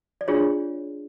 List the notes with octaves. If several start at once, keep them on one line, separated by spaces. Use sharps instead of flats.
D5
D4 F4 G#4 C#5